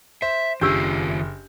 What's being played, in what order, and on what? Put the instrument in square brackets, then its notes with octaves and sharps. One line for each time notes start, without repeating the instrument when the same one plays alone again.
[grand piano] C5 [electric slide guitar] E5
[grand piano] F#1 G6 [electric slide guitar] D#3 C#4 F4 [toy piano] D4 G4 E6